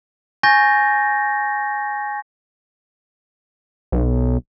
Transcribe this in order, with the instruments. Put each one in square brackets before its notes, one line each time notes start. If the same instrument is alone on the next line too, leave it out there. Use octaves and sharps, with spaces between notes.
[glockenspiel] G#5 C#6 G6 A6 A#6
[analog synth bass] B1